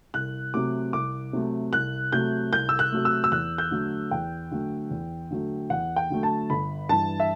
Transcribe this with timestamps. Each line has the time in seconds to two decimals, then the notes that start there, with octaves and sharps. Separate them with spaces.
0.14 C2 F#6
0.53 C3 F#3 A3 D6
0.93 C2 D6
1.33 C3 F#3 A3
1.73 C2 F#6
2.12 C3 F#3 A3 G6
2.52 C2 G6
2.69 E6
2.79 F#6
2.92 C3 F#3 A3
3.05 E6
3.24 E6
3.32 E2 F#6
3.58 G6
3.71 D3 F#3 A3
4.11 E2 G5
4.51 D3 F#3 A3
4.91 E2
5.31 D3 F#3 A3
5.70 E2 F#5
5.96 G5
6.10 D3 F#3 A3
6.23 A5
6.50 G1 B5
6.89 G2 E3 A5
7.20 E5